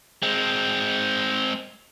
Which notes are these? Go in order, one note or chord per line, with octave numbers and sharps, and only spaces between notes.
G#3 C4